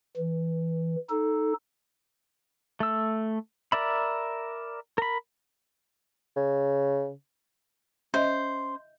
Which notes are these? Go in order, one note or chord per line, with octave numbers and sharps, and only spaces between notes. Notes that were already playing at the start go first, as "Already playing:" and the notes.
E3
D#4 A4
A3 E6
A#4 D5 E5 B5
A#4 B5
C#3
C#4 C5 D#5 E5